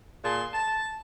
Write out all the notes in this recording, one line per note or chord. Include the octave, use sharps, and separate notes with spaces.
A#2 G#4 A5 C6
A5